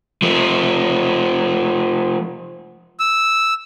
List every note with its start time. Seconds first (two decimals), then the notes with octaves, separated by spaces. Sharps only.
0.22 F3 A3
3.00 E6